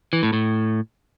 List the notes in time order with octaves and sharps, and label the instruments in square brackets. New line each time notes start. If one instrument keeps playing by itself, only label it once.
[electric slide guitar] E3
A2
A2